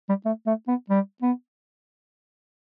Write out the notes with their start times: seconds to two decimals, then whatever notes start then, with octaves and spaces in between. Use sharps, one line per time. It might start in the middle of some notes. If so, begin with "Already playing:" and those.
0.09 G3
0.25 A3
0.47 A3
0.68 B3
0.90 G3
1.22 B3